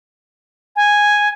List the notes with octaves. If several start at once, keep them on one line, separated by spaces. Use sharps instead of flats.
G#5